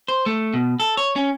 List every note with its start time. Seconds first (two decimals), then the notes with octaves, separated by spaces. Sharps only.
0.08 C5
0.26 A3
0.53 B2
0.80 A4
0.97 C#5
1.16 C#4